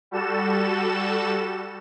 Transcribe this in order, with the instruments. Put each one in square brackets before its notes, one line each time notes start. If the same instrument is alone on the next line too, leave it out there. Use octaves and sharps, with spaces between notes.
[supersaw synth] G3 F#4 A4 E7